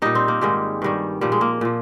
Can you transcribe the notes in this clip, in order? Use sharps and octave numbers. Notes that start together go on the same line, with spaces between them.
A#2 G3 D#4
C4
A#3
G#2 D#3 G3 G#3
G2 D#3 G3
A#2 F3 G3
G#3
A#3
A#2 F3